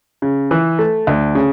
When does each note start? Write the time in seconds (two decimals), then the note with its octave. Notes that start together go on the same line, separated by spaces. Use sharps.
0.22 C#3
0.51 E3
0.79 A3
1.07 D2
1.35 C#3